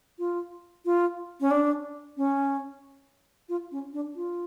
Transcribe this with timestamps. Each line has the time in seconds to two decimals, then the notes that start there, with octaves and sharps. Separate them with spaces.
0.19 F4
0.85 F4
1.40 C#4
1.51 D4
2.17 C#4
3.49 F4
3.71 C#4
3.93 D4
4.15 F4